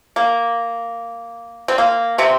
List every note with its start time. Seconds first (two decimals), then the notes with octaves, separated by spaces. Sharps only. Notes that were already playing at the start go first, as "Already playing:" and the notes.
0.16 A#3
1.68 C4
1.78 A#3
2.18 C3 C4